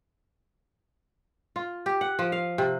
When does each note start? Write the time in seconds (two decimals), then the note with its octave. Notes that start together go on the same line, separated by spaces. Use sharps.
1.56 F4
1.86 G4
2.01 F#5
2.19 F3
2.32 F5
2.58 C3